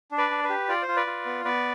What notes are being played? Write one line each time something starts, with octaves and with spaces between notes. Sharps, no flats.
D4
B4 D5
D4
B4
G4
F4 D5
C5
F4
B4 D5
F4
B3
B3 B4 D5